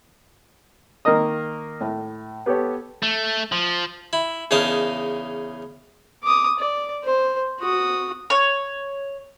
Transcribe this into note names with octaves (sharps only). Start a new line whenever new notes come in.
D#3 A#3 A#4 D#5 D#6
A2
B3 G4 A4 B4 C#5
A3
F3
E4
E2 C#3 C#4 D#4 A#4 A5
D6 D#6
D5
C5
F#4 D#6
C#5